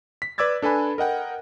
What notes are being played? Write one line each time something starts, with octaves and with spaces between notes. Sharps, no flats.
B6
B4 D5 D6 E6 G#6 A6
D4 A4 B4 G#5 B5
A#4 D#5 F#5 G5